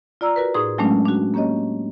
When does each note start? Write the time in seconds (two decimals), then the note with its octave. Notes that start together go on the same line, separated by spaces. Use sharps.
0.21 F4 D5 A#5 E6
0.36 F#4 A#4 B4
0.54 A2 D#4 G#4 C6 D#6
0.78 F#3 G#3 A3 C#4 D4
1.05 D4 F#4
1.34 A#3 C#4 G4 C#5 D#5